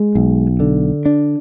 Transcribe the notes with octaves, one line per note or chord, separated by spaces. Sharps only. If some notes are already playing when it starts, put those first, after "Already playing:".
Already playing: G#3
B1
D3
D4